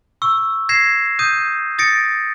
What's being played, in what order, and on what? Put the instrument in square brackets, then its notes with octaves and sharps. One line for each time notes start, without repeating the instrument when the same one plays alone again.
[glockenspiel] C#6 E6
G#6 A#6 C7 E7
D#6 G6 D#7
D#6 A6 A#6 C#7 D7